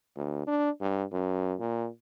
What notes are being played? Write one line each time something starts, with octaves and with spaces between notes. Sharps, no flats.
D2
D4
G2
F#2
A#2